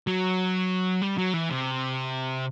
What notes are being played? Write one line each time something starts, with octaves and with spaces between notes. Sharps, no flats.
F#3
G3
F#3
E3
C3